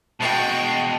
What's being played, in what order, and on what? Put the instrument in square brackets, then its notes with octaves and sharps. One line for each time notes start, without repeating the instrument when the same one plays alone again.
[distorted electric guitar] B2 G#3 [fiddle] F#4 G5 [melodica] A5